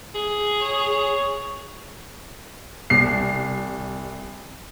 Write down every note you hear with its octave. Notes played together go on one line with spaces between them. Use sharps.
G#4
C#5
C2 C7